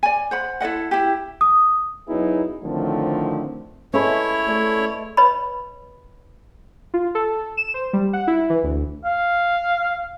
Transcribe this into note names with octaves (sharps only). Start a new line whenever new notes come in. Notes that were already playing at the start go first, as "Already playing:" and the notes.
D5 G#5
C5 F#5 B5
E4 A4 D#5 F#5
E4 G4
D#6
F#2 F#3 B3 D#4 E4 G#4
A2 D3 D#3 F3 A3 C4
G#3 A3 C#4 E4 B4 C#5
A3 D5
B4 C#5 D#5 B5
F4
A4
E7
C5
G3
F#5
E4
E3
D2
F5